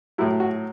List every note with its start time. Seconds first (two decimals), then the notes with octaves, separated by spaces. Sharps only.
0.18 A2 F#3 E4
0.40 F#4